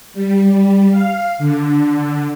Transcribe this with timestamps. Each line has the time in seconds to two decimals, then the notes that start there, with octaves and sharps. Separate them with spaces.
0.14 G3
0.91 F5
1.38 D3